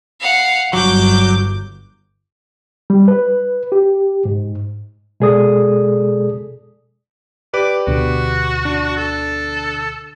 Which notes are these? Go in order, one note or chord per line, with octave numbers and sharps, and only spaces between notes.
F5 F#5
G1 G2 F#3 D6 G6
G3
B4
G4
G#2
B2 G#3 G#4 A4 D5 D#6
G4 B4 D5 D6
D2 B2 D3 F#4
D4
A4